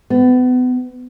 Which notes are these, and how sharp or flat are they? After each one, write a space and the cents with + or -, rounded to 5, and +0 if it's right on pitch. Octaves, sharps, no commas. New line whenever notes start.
B3 +30